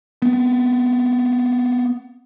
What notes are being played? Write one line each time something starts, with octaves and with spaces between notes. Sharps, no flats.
B3 C4